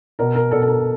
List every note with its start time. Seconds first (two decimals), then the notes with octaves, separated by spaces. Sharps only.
0.19 B2 A#4
0.35 A#4
0.51 B2 A4
0.62 A4
0.68 A#4